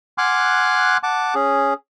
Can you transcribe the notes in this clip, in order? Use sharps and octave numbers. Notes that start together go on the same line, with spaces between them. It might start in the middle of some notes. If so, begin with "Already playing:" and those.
F#5 G#5 C6 D6 F6 F#6
F#5 A5 D6
C#4 G#4